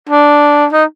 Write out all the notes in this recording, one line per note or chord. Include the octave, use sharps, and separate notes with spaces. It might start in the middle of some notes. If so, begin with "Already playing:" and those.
D4
D#4